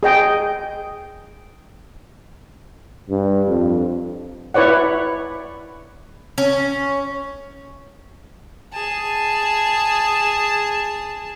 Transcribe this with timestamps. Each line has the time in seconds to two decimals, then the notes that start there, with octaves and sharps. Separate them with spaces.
0.03 G#4 D#5 G5
3.10 G2
3.48 F2
4.54 E4 B4 C#5 D5 F#5
6.38 C#4
8.73 G#4 A5